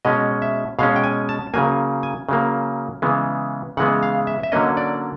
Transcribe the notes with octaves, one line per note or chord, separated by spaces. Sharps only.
B2 G#3 C#4 D#5
E5
B2 G#3 C#4 F5
G5
G#5
A5
C#3 F#3 A#3 G#5
G#5
C#3 F#3 A#3
C#3 E3 G#3 B3
C#3 E3 G#3 B3 F#5
F5
E5
E5
D3 F#3 A#3 C#4 D#5
D5